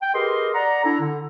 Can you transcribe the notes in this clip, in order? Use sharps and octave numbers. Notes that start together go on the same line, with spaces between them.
G5
G4 G#4 A#4 B4 D#5 C6
D5 F#5 A#5
D4 E4 A4 A#5
D3